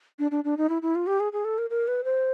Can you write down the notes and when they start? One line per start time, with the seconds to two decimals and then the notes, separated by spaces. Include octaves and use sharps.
0.19 D4
0.31 D4
0.44 D4
0.57 D#4
0.69 E4
0.82 E4
0.95 F4
1.07 G4
1.20 G#4
1.33 G#4
1.45 A4
1.58 A#4
1.70 A#4
1.88 B4
2.04 C5